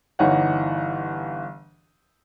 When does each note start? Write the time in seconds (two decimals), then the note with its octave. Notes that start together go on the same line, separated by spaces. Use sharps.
0.19 G1 E3 D#4 C#5 D#5 F#5